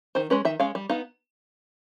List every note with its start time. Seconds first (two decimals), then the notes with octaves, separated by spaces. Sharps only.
0.15 D#3 C5
0.30 G#3 C#4 B4
0.45 D#3 E5
0.60 G#3 C#4 F5
0.75 G3
0.89 B3 D#4 F5